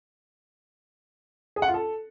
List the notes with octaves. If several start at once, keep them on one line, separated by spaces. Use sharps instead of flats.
G#4
F#5
F4
A4